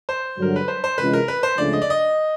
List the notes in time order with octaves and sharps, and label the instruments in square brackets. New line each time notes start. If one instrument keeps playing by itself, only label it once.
[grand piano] C5
[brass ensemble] G2 D3 F#3 [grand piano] A#4
[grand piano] B4
C5
C5
[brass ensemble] C3 E3 G#3 C#4 F4 [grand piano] B4
[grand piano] A#4
B4
C5
[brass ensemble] C#2 C#3 F3 A3 D4 [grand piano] D5
[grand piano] D#5
D5
D#5